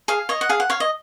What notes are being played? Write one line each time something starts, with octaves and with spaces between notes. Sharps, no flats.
G#4 F5
C#5 D#5
F#5
G#4 F5
F#5
C#5 F5
D#5